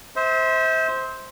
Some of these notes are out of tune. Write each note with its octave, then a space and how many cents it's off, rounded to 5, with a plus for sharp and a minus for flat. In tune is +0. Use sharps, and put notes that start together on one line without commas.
C5 +0 E5 -40